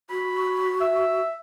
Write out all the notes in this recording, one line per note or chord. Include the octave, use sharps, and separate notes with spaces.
F#4 B5
E5 E6